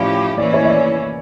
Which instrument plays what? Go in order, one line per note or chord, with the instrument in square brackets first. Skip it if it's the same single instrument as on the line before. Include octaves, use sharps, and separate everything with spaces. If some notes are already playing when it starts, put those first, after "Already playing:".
Already playing: [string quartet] A2 F3 C#4 E4 G4 [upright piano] D5 E5 F5
[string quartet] E3 A#3 C#4 E4 [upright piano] D5
[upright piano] C#5 E5
E5
D5